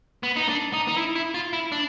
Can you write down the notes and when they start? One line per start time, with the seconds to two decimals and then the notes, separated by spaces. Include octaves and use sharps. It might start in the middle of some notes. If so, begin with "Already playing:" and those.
0.23 B3
0.36 D#4
0.49 D4
0.73 D#4
0.88 D#4
0.98 E4
1.15 E4
1.34 F4
1.53 E4
1.72 D4